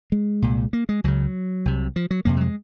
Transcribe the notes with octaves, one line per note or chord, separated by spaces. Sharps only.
G#3
C2 A#2
A#3
G#3
C#2 C#3 F#3
C2 C3
F3
F#3
F2 C3 A#3
F#3
G#3